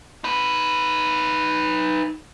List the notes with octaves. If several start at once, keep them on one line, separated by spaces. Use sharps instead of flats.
D#4 B4